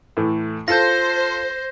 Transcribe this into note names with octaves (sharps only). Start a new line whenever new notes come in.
A2 E3 A3
F4 A4 C5 G6 A#6